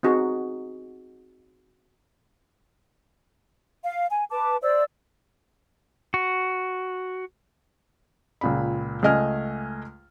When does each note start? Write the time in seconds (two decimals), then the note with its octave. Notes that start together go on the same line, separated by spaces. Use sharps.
0.03 C4 D#4 F#4 G#4
3.83 F5
4.10 G#5
4.31 B4 A5 D6
4.62 C5 D5 E5 E6
6.14 F#4
8.41 C#2 A#2 B5
9.03 C#2 A3 D#5 G#5 F6